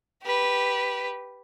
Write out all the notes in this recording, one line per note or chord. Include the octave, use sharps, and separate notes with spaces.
G4 B4